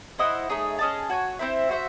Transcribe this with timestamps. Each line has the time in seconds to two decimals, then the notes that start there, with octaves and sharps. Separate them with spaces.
0.18 E4 C5 D#5 F#5
0.49 A3 D#4 G#4 C#5
0.79 C#4 G#4 D#5 A5
1.09 F#4 C#5 G#5
1.39 C4 E4 C5 E5
1.69 F#4 C5 E5